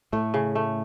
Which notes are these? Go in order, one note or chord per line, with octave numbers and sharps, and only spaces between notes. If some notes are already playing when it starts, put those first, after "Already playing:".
A2 A3
C#3
A3